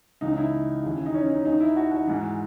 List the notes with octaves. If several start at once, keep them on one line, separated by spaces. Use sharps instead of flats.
C#2 C#3 E3 D#4
D#4
E4
D#2 C#3 E3
D#4
C#4
D#4
D#2 D#3 D#4
E4
F#4
F#4
G#2 E3